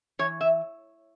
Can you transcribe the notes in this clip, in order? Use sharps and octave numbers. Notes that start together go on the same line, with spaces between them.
E3 C#5
E5